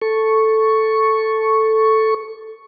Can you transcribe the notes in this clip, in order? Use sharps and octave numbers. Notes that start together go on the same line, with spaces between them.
A4 C#6